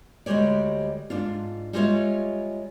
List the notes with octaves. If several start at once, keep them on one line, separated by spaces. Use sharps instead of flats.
D2 G3 G#3 G4 C#5 D5
G#2 D4 F4
G3 G#3 F4 A#4 C#5 E5